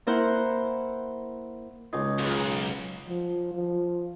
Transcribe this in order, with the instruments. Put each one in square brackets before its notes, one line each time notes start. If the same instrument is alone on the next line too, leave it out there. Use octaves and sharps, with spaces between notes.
[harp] A#3 E4 A#4 C5 F#5
[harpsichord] C#2 D#4 [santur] C#5 D#5 C6
[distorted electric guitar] B1 F#2 [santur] F4 G#4 B4
[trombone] F3
F3